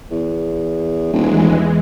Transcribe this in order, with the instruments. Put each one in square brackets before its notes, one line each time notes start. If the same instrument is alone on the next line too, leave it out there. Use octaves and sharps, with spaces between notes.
[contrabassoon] E2
[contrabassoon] D#1 [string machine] E2 E3 G#3